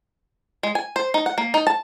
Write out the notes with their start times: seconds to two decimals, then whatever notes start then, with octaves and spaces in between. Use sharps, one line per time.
0.63 G#3
0.75 G#5
0.96 C5
1.14 D#4
1.26 F#5
1.38 A#3
1.54 D#4
1.67 A5